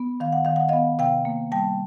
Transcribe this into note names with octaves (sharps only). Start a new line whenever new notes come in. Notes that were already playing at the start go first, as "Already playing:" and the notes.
Already playing: B3
D#3 F5
F#5
D#3 F5
F#5
B3 D#5 F5
C3 F5 G5
A#3
G3 G5 A5